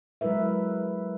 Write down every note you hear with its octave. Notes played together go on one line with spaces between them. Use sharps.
F#3 G#3 E4 A#4 B4 E5